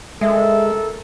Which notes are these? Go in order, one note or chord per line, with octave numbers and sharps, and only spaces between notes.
C#2 G#3 A4 A#4 E5